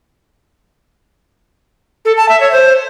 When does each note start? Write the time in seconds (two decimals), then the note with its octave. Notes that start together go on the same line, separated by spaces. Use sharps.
2.05 A4
2.17 A5
2.29 E5
2.40 C#5
2.52 C5